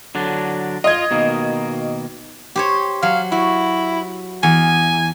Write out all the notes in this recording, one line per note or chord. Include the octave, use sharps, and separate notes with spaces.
D3 F#3 D4
F4 D#5 G#6
B2 D#3 A#3
G4 C5 C#5
F#3 F5
E4 F#4
E2 G#5